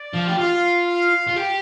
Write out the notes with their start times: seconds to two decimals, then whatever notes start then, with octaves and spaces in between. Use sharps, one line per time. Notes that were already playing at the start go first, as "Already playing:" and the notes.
Already playing: D5
0.13 F3
0.27 G4
0.38 F4 F5
0.87 F5
1.27 F4
1.36 G4